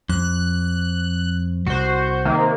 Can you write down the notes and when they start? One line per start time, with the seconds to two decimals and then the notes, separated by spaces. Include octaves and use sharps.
0.10 F2 F#6
1.67 C2 F#4 C5
2.25 C3 D#3 A#3